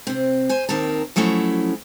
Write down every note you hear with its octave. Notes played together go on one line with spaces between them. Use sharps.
C3 C4
C5 G#5
D#2 D#3 C4 A#4 A5
F3 F#3 A3 C#4 E4